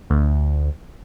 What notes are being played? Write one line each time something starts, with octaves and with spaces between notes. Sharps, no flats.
D2